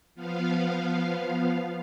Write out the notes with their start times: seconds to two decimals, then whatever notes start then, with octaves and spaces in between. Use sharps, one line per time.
0.15 F3 B3 F5